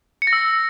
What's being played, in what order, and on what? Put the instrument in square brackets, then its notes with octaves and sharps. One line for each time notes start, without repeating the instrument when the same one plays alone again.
[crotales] C#7
A#6
E6